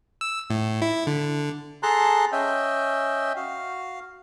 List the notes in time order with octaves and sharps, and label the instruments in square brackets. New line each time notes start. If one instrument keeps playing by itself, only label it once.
[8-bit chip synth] E6
A2
E4
D3
[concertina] G#4 A4 A5 A#5 C6 F#6
C#4 D#5 E5 G5
F#4 F5